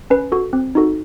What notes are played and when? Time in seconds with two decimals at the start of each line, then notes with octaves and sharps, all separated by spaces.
0.10 C#4 B4
0.32 F#4 A4
0.53 C4
0.75 D#4 F#4 A4